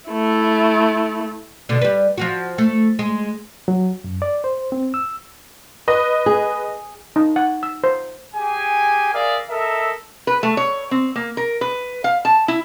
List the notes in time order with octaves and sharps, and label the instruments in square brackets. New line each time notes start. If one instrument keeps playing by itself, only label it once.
[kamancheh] A3 E4
[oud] B2 D3
G3 B4
F3 F4 F#4
A3
G#3
[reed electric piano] F#3
F#2
D5
C5
C4
E6
[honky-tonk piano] B4 D#5
[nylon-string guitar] G#4
[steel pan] D#4
F#5
E6
C5
[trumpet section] G4 G#4 G#5
G#4 A#4 D5 E5 F5
A4 A#4 D#5 E5
[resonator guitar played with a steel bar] B4
A3
C#5
C4
A#3
A#4
B4
F5
A5
E4